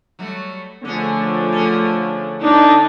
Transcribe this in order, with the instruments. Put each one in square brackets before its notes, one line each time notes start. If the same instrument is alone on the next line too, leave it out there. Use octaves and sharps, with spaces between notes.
[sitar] F#3 G3 A3
[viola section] D3 F3 A3 [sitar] C#4 G#4
[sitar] C#4 G#4
[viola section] D3 D#4 [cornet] D4